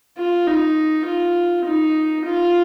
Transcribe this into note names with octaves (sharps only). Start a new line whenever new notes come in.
F4
D#4
F4
D#4
F4